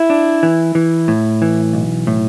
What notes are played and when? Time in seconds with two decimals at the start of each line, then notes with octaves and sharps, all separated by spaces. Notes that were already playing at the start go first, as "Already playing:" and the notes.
Already playing: E4
0.10 D4
0.43 E3
0.75 E3
1.08 A2
1.42 E3
1.73 B1
2.07 A2